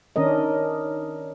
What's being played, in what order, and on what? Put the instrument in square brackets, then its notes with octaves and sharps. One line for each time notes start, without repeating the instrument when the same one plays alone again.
[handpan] D#3 C#4 D4 A#4 D#5